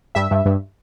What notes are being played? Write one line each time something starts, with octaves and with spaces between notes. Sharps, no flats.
G2 E5
G2
G2